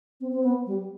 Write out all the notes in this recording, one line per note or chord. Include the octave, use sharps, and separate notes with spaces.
C4
C4
B3
G3